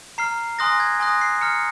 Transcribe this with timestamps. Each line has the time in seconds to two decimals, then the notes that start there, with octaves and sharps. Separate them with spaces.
0.18 A#5 F6 C7
0.59 G#5 C6 D#6 F#6 A#6
0.80 G#6
1.00 G#5 C6 D#6 F#6 A#6
1.21 C7
1.41 A#5 F6 C#7